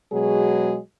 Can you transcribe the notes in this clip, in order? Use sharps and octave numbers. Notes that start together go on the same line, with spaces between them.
B2 F#3 G#3 G#4